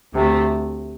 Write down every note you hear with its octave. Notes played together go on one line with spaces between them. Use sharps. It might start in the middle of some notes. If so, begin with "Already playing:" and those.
D2 C3 A3